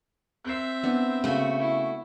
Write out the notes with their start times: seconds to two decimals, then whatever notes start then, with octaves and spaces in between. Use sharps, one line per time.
0.44 C4 E5 F#6 C7
0.83 B3 D4
1.24 C#3 A3 F#4
1.59 E4